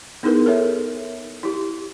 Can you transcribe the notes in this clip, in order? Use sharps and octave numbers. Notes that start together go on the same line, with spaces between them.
B3 D#4 E4 G#4 A#4 B4
A4 A#4 C#5 E5
E4 G4